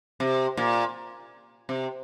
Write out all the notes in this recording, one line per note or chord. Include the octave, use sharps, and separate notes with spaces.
C3
A#2
C3